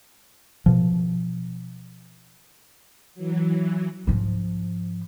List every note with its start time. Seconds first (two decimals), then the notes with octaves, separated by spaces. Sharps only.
0.66 B2 F3
3.15 E3 F#3
4.07 G#2 F3